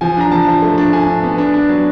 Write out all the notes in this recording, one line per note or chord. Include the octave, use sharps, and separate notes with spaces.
F3 G#5
D4 A#5
F3 A5
F3
A3
D4
D4 G#5
D4
B3
D4
D4
F#3